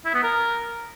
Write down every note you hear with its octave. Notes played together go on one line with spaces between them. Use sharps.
E4
B3
A#4